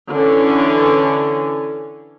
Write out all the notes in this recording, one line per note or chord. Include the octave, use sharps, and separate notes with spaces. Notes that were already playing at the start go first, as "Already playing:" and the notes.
D3 E3 C#4